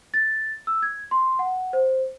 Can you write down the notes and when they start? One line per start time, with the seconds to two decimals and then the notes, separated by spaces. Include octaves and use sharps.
0.14 A6
0.67 E6
0.82 G#6
1.11 C6
1.39 F#5
1.73 C5